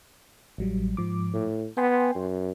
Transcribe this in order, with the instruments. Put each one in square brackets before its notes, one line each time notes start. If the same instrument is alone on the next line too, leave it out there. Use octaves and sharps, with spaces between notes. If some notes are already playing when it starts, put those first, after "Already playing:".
[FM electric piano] A1 F#3 G3
G#2 F3 D6
[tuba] A2
[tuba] B3 [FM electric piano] G5 G#5 C6
[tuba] F#2